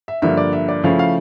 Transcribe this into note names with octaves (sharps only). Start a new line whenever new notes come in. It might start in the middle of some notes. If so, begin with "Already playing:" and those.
E5
G2 D3 F3 A#3 E5
D5
E5
D5
C#3 F3 A3 C#4 E4 F5
F5